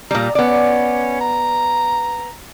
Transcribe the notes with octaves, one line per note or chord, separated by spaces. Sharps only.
A#2 G3 A#5
B3 C#4 D5
A#5